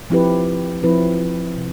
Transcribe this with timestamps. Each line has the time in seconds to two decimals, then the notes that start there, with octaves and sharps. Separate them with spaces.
0.10 F3 C4 E4 G4 B4
0.83 F3 C4 E4 B4
1.57 C3